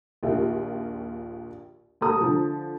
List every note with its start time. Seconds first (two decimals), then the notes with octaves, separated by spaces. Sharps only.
0.23 A#1 D#2 F4
2.01 D#2 A4 A#5 D#6
2.21 D3 F3